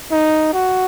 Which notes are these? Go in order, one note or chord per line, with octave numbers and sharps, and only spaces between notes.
D#4
F#4